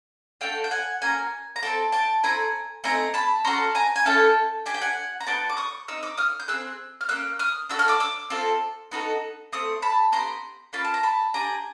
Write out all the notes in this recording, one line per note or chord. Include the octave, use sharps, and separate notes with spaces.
A3 D4 F#4 A4 F5 G5
G5
F#5 G#5
A#3 C#4 F#4 G#5 A#5
A#5
C4 F4 A4 G5 A5
G5 A5
A3 C4 E4 G#5 A#5
A3 C4 D#4 G#5 A#5
A5 B5
C#4 F#4 A4 A#5 C6
G#5 A#5
G#5
A3 C#4 E4 A4 G5 A5
D4 G4 G#5
G5
F#5 G#5
A#5
B3 D4 F#4 G5 A5
D6
C#6 D#6
C4 D#4 E6
D6 E6
D#6 F6
G6
C4 E4 G#4 E6 F#6
F6
A#3 C#4 E6 F#6
D#6 F6
D4 F#4 A4 E6
F6
D6 E6
D6 E6
C4 F4 A4
B3 D#4 F#4 A4
A3 C4 D#6
A5 B5
B3 E4 G4 A#5 C6
A#3 C#4 F4 A5 B5
A5
A#5
A5 B5
D4 G4 G#5 A#5